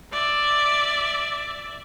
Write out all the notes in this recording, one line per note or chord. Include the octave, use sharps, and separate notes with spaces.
D5 E5